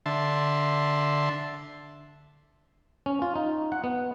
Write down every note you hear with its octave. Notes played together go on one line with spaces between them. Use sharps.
D3 E5 A5 C6
C#4
F4
D#4
F#5
B3